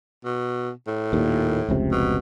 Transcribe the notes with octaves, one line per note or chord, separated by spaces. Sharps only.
B2
A2
D#2 A#2
F1 C#2 C3
B2